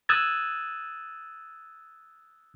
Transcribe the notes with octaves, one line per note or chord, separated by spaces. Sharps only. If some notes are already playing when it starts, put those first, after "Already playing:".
D#6 E6 F#6 G#6 A6